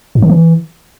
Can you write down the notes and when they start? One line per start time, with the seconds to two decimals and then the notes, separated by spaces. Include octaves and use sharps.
0.15 G#2
0.22 D#3
0.29 E3